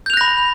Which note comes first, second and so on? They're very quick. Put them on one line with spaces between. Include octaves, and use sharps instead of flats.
G6 F7 F#6 A#6 B5